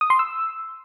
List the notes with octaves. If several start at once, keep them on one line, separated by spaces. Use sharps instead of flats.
D#6
C6
E6